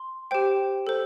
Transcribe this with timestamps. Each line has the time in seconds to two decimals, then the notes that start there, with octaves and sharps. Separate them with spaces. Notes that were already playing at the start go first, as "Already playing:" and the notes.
Already playing: C6
0.31 G4 C5 G5
0.87 A4 C5